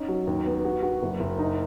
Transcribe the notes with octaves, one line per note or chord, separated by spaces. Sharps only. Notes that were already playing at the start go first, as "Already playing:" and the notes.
Already playing: C#4 D#4
F#3
D#2
B3
F#4
F#4
F#1
F#1
D#4